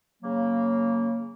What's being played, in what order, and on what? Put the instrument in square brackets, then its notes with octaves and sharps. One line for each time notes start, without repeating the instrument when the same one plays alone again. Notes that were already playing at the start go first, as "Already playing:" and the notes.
[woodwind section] C#3 F#3 A#3